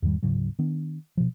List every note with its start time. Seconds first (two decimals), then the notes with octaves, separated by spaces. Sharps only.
0.02 E2 G#2 D#3 G3
0.23 D1 G#2 C#3 F#3
0.59 D#3 B3 D4
1.17 B2 F3